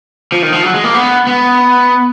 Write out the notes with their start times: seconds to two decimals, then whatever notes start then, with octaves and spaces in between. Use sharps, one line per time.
0.32 F3
0.43 D#3
0.53 F3
0.64 F#3
0.74 G#3
0.84 A#3
0.94 B3
1.27 B3